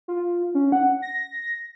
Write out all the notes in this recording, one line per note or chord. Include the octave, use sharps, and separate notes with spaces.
F4
C#4
F#5
A#6